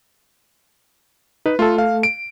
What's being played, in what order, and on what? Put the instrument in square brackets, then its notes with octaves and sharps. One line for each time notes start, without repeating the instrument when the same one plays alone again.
[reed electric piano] D#4 [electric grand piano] B4
[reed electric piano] A3 A4 [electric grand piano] F4
[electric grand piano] F5
D7